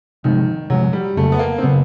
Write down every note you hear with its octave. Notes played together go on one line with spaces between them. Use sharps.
C3 D#3 F3 G#3
C3 F3 F#3 G#3
G3
F2 C#3 F#3 A3 A#3
B3
A#3
C4
C#3 F#3 A#3 B3